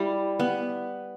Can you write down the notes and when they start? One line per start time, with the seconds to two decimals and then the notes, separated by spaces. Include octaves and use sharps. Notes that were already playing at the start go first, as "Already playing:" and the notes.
Already playing: G3 E4
0.40 B3